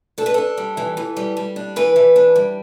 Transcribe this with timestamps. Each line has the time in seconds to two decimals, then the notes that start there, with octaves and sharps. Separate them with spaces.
0.18 D4 A4
0.26 B4
0.34 D4 A4
0.57 G3
0.77 E3
0.97 E3
1.17 G3
1.37 G3
1.56 D4
1.76 E3 B4
1.96 E3
2.16 D4
2.36 G3